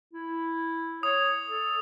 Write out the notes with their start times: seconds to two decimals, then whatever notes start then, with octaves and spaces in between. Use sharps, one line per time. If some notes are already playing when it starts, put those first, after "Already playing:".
0.14 E4
1.03 C#5 D#6
1.48 A4